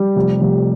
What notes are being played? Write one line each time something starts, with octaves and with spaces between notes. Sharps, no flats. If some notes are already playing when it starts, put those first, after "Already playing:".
Already playing: G3
F1
F1